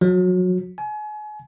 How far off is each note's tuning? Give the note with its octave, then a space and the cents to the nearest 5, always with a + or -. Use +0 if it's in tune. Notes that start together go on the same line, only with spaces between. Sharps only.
F#3 -25
G#5 +35